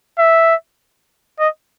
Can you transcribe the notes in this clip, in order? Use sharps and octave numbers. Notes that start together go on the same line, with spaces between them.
E5
D#5